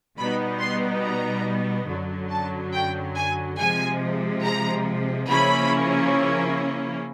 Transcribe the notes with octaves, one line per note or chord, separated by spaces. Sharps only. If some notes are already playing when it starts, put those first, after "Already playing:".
B2 G3 B3 D#4 B5
C6
A#5
F#2 D3 F#3
A5
G5
G#5
C3 F3 G#3 G#5
A#5
C#3 F3 A#3 C#4 E4 B5